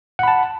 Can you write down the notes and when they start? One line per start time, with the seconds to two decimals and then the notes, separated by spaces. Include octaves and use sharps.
0.19 F#5
0.23 B5
0.28 A5